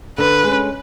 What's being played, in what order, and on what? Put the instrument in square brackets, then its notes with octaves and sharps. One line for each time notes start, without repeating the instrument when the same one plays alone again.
[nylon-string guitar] D3 [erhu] B4
[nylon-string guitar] G#3 C#4